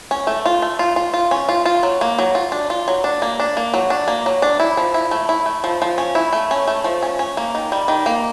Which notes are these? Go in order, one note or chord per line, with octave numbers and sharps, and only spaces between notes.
C#4
A3
F4
A3
F4
F4
F4
C#4
F4
F4
F#3
A#3
F#3
F4
D4
F4
F#3
D4
A#3
D4
A#3
F#3
D4
A#3
F#3
D4
E4
F3
E4
A3
E4
A3
F3
F3
C#4
E4
A3
C#4
A3
F3
C#4
C#4
A#3
D#3
G3
D#3
A#3